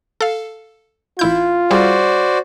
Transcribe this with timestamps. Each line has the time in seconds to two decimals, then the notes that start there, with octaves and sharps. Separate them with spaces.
0.21 A4 F5
1.19 A1 E4 F4 G6
1.71 G3 F#4 G#4 C5 D5